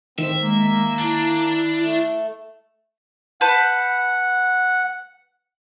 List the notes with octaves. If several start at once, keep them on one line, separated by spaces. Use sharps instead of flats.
A2 D#3 C4 E5
G#3 A#3
D4 E4
A3
B4 F#5 A5 G6